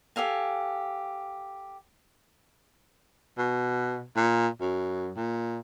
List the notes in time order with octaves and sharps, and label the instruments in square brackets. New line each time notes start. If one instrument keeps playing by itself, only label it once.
[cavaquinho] G4 A4 F5 G#5
[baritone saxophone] B2
A#2
F#2
A#2